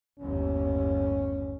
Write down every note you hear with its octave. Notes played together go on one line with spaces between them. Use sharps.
G1 D#2 A2 C#4